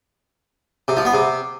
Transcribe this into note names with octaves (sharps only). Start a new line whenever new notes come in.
C3
F3
B3
C3